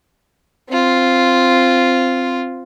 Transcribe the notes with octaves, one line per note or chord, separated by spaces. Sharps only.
C4 F4